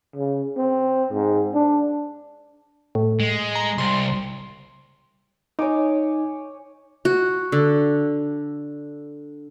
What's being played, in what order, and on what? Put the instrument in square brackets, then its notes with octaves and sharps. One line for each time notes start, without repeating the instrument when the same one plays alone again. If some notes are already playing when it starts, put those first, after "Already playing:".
[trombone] C#3
C4
G#2
D4
[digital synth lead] A2
[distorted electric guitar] G#3
[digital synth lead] A#5
[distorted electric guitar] C2 [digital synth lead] C6
[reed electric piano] D#4 [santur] C#5 G#5 D6
[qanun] F#4
D3